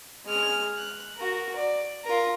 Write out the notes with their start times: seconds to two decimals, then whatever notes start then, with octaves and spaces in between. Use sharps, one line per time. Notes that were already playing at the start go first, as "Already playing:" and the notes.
0.25 G#3 F6
0.77 F#6
1.17 F#4 A#4
1.56 D5
2.04 F4 A#4